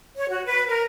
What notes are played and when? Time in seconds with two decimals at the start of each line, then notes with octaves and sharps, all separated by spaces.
0.17 C#5
0.30 F#4
0.45 B4
0.67 A#4